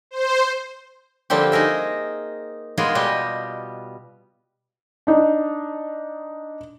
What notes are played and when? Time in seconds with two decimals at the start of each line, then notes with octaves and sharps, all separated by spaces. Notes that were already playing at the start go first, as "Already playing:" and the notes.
0.11 C5
1.30 D3 F3 G3 A#3 C4 G4
1.52 D#4 G#4 A#4 E5
2.77 G#3 A#3 B3 F4 G#4 A#4
2.95 B2 G3 G4 D#5
5.07 D4 D#4